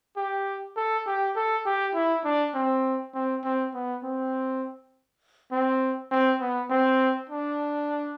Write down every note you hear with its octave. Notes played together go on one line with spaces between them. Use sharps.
G4
A4
G4
A4
G4
E4
D4
C4
C4
C4
B3
C4
C4
C4
B3
C4
D4